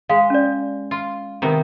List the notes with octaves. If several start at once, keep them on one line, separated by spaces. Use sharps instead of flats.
G#3 F5
C#4 D5
F4
C3 D#3 B3 A#5